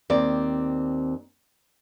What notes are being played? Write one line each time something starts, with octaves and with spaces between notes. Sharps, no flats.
D#2 C4 D5